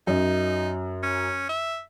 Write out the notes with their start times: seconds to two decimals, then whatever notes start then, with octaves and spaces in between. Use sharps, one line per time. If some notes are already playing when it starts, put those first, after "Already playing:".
0.07 F#2 D#4
1.03 C#4
1.49 E5